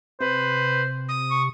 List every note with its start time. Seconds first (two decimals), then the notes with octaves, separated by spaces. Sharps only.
0.20 C3 B4 C5
1.09 D#6
1.31 C#6